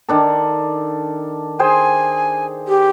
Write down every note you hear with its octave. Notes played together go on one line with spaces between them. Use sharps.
D#3 D4 A4
G#4 C5 G5 G#5
G4